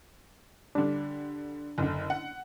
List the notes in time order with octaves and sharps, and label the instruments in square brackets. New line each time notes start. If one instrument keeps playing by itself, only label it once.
[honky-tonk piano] D3 G3 [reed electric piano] D4
[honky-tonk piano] F#1 D3
F#5